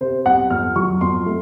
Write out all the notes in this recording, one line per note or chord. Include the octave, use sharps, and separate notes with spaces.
C3 C5
C2 F#5
F2 F6
F#3 C#6
F2 C6
A3